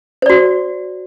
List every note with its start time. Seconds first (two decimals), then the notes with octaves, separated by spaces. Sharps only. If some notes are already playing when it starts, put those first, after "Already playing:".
0.22 C5
0.26 D5
0.30 F#4